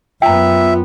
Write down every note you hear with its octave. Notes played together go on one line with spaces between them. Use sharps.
F#2 B3 F4 E5 G5 A#5